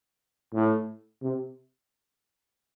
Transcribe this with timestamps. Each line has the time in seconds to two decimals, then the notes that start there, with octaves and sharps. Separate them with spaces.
0.54 A2
1.22 C3